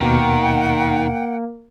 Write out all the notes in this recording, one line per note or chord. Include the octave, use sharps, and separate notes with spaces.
D#2 B2 D#3 A#3 F#5 G5